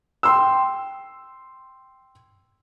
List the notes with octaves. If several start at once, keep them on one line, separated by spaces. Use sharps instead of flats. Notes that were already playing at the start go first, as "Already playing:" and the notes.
G5 C6 E6